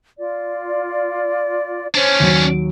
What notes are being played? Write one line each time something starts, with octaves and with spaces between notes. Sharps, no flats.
F4 D5
C#4 D4 C5 C#5
D#2 F#3